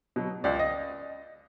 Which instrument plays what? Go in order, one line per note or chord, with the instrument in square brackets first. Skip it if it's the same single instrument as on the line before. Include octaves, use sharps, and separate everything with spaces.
[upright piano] B2 F#3
C#2 D5
D#5